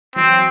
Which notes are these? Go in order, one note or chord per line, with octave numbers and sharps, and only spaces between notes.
E3 F#3 C4